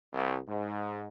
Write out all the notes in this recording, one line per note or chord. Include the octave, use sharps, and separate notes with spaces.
C2
G#2